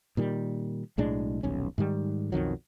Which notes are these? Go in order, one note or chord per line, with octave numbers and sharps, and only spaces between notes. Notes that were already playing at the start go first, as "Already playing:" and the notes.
A#2 D#3 G3
B1 A2 G#3 D4
D#1 B1 C#4
G#2 D#3 G3
B1 F2 D#3 F#3